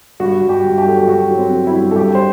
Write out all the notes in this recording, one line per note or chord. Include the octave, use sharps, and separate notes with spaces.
G2 F#4
G2
G4
G2
G4
F#3 A4
G4
G2 F#4
F#3
C4
F#3
E4
G2
A4
G2 G4
C5